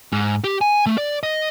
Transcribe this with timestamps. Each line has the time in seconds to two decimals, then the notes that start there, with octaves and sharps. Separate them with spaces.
0.12 G#2
0.44 G4
0.61 G#5
0.86 A3
0.98 D5
1.23 D#5